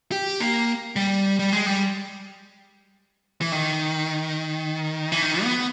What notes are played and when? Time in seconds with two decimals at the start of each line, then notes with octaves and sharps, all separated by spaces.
0.12 G4
0.40 A#3
0.96 G3
1.39 G3
1.53 G#3
1.66 G3
3.41 E3
3.52 D#3
5.12 E3
5.22 D#3
5.43 B3